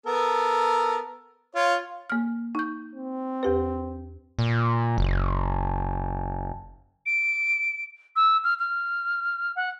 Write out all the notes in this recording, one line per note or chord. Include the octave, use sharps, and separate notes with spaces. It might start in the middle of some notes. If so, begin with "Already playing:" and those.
B3 A4 A#4
F4 C#5
A#3 F6
D#4 G6
C4
E2 G4 B4
A#2
F#1
D7
E6
F6
F6
F#5